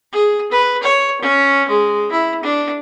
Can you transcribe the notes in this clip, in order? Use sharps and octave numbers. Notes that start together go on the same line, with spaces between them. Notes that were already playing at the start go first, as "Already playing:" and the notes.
G#4
B4
C#5
C#4
G#3
E4
D4